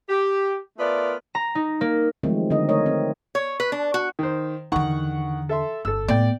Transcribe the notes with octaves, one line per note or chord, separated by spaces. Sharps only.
G4
A3 B3 F4 A#4 D5
A#5
D#4
A#3
D#3 F3 F#3 G#3 A3 C4
D3 D#3 C4 D#4 D#5
A3 D#4 A#4 C#5 D#5
C4
C#5
B4
D4
F#4
D#3 C5
E2 D3 D#3 F#5 C#6
A4 E5 C6
G1 A4 E6
A2 B3 D5 G5